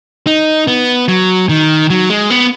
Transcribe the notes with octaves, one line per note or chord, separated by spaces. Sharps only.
D#4
B3
F#3
D#3
F#3
G#3
B3